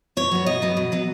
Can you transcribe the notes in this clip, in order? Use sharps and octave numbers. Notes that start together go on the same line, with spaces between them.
B2 C#5
F#3 B3
B2 D#5
F#3 B3
B2
F#3 B3